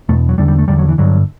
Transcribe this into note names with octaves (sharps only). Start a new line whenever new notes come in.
E2 B2 A3
F#3
E2 D3 G3
G3
A3
E2 D3 G3
F#3
E3
G2 D3 F#3